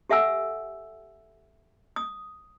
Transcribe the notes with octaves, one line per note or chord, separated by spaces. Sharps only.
G4 A4 E5 F#5 G#5 E6
D#6